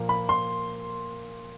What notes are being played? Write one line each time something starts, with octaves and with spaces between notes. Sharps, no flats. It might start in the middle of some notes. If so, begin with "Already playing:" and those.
Already playing: A#2 F3 A#3
B5
C6